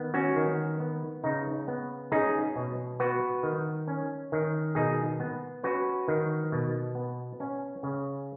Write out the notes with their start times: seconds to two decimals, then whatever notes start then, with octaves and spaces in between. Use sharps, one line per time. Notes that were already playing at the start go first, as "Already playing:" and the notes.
Already playing: D#3 B3
0.14 C#4 F#4
0.36 D#3
0.80 B3
1.24 C#3 D#4
1.68 B3
2.12 C#4 D#4 G#4
2.56 B2
3.00 B3 F#4 B4
3.43 D#3
3.88 C#4
4.32 D#3
4.75 B2 D#4 G#4
5.20 B3
5.63 C#4 F#4 B4
6.08 D#3
6.52 B2
6.95 B3
7.40 C#4
7.83 C#3